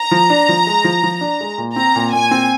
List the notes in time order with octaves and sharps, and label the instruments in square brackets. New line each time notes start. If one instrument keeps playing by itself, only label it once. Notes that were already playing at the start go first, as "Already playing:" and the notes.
Already playing: [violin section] A#5
[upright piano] F3
D4
F3
G#3
F3
F3
D4
G#3
A#2
[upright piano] C4 [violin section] A#5
[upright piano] A#2
[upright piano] A#2 [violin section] G#5
[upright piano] C4